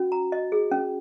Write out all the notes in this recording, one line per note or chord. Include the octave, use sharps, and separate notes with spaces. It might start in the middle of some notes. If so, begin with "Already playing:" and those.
Already playing: C#4 F#4
A#5
D#5
G#4
C#4